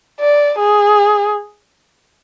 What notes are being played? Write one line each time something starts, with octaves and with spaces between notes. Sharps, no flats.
D5
G#4